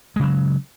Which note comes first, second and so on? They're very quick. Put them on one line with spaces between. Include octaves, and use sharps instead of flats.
G#3 C#3 F#3